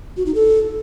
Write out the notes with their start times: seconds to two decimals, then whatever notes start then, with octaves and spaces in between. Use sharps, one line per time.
0.17 F#4
0.26 D#4
0.35 A4